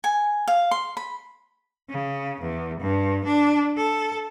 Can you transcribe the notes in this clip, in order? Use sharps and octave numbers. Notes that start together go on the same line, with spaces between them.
G#5
F5
C6
B5
C#3
E2
G2
D4
A4